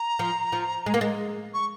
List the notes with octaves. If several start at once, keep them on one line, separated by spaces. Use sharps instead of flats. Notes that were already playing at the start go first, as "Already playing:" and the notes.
Already playing: A#5
F3
F3
G#3
A#3
G#3
C#6